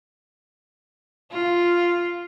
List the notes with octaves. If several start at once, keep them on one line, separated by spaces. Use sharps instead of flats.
F4